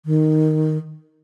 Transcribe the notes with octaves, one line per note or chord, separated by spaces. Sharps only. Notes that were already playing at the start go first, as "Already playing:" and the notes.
D#3